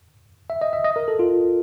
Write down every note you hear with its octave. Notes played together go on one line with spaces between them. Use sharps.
E5
D#5
E5
D#5
A#4
A4
F4